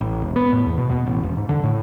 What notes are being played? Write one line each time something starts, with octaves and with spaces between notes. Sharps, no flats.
A1
E1
B3
A2
E2
B2
B2
A1
E1
G#2
D3
A2